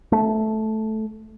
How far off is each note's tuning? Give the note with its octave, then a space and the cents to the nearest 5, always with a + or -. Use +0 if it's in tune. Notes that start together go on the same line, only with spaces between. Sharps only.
A3 -10